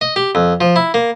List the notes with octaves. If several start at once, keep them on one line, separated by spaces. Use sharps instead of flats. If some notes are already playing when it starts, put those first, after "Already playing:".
D#5
G4
F2
F3
E4
A#3